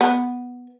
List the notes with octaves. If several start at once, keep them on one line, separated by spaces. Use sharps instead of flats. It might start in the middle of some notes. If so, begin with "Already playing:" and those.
B3